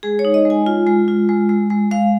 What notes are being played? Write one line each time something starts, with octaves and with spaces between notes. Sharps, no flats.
G#3 G#4
C#5
D#4
D#5
G#3 G#5
F4
G#3
F4
G#3
G#3
G#3
G#3 F5